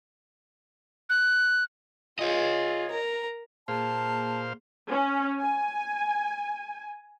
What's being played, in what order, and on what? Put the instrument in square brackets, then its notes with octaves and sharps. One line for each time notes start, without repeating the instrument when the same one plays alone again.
[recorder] F#6
[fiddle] F4 G#4 [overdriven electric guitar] C#5 D#5
[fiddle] A#4 A#5
[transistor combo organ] A#2 C5 F5 [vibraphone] A#3 G#4 [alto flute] A5
[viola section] C#4
G#5